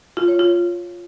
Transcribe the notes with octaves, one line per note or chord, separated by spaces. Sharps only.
F4
C#5
F4